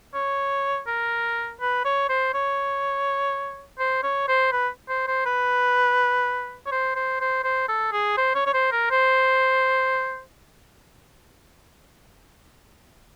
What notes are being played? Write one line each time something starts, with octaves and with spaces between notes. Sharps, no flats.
C#5
A#4
B4
C#5
C5
C#5
C5
C#5
C5
B4
C5
C5
B4
C#5
C5
C5
C5
C5
A4
G#4
C5
C#5
C#5
C5
A#4
C5